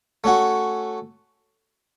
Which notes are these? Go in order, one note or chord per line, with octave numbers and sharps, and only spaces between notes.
A3 C#4 F#4